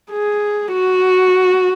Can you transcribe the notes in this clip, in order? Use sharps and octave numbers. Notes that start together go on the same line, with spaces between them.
G#4
F#4